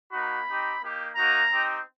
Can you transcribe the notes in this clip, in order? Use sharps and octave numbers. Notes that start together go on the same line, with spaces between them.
A#3 D#4 F#4 B5
C4 D#4 G4
A#3 D#4 G4
A#3 D#4 F#4 A#5
C4 D#4 G4